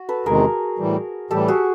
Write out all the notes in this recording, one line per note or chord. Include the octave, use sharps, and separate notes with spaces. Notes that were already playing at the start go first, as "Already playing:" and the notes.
Already playing: F#4
A4 B4
E2 C3 D#3 G#3 G#4 A#4
A2 E3 G3
A2 E3 G3 G4 A4
F#4 G#4